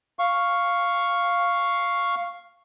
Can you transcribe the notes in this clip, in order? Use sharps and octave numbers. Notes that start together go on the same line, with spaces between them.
F5 C#6